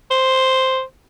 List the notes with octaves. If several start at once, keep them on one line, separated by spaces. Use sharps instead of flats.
C5